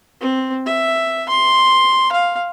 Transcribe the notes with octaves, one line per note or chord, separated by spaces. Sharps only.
C4
E5
C6
F5